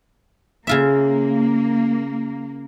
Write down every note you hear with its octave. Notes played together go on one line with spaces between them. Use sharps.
C#3 A#3 F4 E5